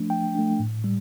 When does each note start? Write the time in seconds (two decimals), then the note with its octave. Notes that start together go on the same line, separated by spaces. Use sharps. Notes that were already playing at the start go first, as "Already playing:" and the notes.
Already playing: F3 A3 D4
0.10 F3 G5
0.35 A3 D4
0.59 A2
0.84 G3